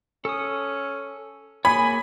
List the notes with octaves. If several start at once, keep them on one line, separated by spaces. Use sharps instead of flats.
C#4 A4 D#6
A#3 G#4 C#5 G#5 B5